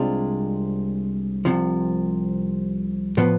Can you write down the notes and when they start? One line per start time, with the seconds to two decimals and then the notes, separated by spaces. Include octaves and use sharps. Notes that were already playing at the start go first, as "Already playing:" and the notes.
Already playing: C2 C3 G#3 D4 F4
1.45 C2 C3 F3
3.17 A2 F3 B3